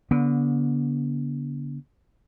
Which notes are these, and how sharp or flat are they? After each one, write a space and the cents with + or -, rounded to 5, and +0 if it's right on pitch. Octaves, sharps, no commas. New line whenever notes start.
D3 -35 B3 -35